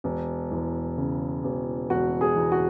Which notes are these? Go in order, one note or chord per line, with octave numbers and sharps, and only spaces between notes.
E1
E2
C#3
E1
E1 F#4
G#4
E2
F#4